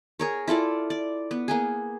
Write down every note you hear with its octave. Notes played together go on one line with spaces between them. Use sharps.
G#4 A#4 C#5
E4 F4 A4 D5
D5
B3
A#3 B3 G#4